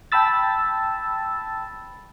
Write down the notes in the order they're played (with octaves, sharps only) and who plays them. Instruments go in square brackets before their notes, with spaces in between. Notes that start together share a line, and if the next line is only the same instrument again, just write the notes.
[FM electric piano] G5 A5 B5 E6 A6